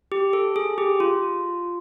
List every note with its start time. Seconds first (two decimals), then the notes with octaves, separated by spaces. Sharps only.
0.12 G4
0.33 A4
0.56 G#4
0.78 G4
1.00 F4